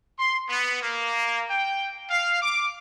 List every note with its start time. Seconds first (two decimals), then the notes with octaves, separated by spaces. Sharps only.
0.19 C6
0.49 B3
0.82 A#3
1.50 G5
2.10 F5
2.42 D6